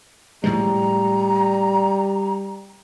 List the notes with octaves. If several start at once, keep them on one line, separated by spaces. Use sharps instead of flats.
A2 F3 G3 G#3 A#5